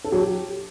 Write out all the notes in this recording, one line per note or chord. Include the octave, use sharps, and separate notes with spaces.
A4
F#3
G4